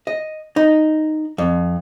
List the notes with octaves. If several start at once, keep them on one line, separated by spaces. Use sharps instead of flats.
D#5
D#4
F2